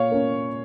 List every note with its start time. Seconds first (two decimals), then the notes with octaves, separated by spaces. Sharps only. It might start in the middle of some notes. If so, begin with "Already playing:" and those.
Already playing: A#2 C#5 F5
0.11 A#3 C#4